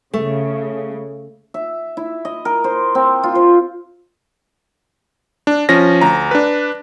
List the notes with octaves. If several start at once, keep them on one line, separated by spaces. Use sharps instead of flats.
C#3 A3
E5
E4
D#5
A#4
C5
C4
F4
C5
D4
F3 C#4 A#6
D2 A#5
D4 B4